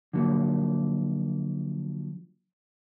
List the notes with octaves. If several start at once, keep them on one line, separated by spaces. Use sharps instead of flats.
D3 F3 F#3 A#3